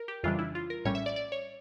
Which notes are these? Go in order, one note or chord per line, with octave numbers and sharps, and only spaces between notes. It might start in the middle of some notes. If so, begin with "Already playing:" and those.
Already playing: A#4
G4
F2 C#3 E3 G3 D4 F4
E4
F4
A#4
A#1 A2 G3 C#4 C#5
E5
D5
D5
C#5